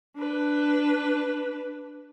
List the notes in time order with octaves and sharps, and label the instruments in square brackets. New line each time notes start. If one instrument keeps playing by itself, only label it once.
[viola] D4 B4